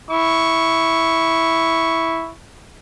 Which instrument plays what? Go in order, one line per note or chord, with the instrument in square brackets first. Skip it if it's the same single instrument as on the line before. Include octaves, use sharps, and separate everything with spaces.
[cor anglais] E4 [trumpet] C#6